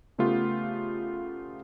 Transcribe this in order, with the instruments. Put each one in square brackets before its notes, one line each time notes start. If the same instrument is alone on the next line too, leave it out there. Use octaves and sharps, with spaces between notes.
[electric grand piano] C#3 A3 B3 F4 G4